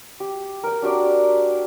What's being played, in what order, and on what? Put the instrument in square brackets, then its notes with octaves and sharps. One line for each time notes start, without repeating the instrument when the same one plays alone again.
[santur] G4
A#4 G5
D4 F#4 G4 D5